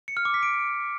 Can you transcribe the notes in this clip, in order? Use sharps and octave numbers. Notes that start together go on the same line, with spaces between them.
C#7
F6
D6
B6
D7